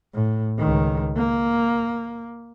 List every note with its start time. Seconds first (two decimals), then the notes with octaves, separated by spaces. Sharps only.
0.14 A2
0.58 C#2 D#3
1.16 A#3